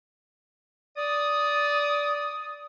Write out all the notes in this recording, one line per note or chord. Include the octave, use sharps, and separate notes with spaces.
D5 D#6